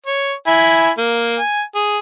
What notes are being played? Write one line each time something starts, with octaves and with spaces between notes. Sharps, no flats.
C#5
E4 G#5 B5
A#3
G#5
G#4